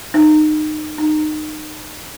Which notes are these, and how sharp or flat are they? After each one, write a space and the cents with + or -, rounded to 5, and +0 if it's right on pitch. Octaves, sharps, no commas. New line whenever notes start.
D#4 -25
D#4 -25